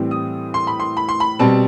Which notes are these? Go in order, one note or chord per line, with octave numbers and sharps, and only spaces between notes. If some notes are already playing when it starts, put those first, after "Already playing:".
Already playing: A2 E3 G3 C4
D#6
C6
B5
C6
B5
C6
B5
B2 G3 C4 A5